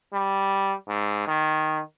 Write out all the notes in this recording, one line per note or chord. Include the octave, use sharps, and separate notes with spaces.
G3
G#2
D#3